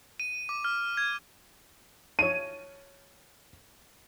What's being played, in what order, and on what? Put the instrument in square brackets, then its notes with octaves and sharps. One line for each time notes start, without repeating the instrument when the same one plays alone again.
[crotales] D#7
D6
F6
G#6
[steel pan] C#5 A5 [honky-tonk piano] D#7